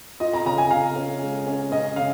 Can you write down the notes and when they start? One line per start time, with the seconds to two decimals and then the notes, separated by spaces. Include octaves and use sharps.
0.20 F4 D#5
0.34 A#5
0.46 C#3 A#5
0.58 G#5
0.71 C#3 F5
0.96 C#4
1.22 G#3
1.47 C#4
1.72 C#4 D#5
1.96 C#3 F5